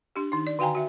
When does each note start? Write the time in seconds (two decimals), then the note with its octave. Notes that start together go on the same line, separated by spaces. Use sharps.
0.16 D4 G4
0.32 D#3 D#4
0.47 D5
0.59 D3 F#4 F5 G5 G#5 A#5
0.75 F#4 E5